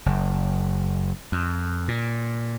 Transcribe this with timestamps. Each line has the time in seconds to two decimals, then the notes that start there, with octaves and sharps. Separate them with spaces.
0.06 F#1
1.32 F2
1.88 A#2